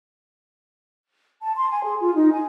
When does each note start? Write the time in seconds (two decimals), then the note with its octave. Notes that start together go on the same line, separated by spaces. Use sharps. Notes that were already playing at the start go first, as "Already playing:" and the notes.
1.42 A5
1.56 C6
1.69 G#5
1.84 G#4
2.00 F4
2.14 D#4
2.33 G#5